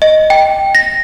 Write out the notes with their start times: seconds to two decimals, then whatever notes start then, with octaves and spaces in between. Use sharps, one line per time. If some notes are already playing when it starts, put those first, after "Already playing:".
0.02 D#5
0.30 G5
0.75 A#6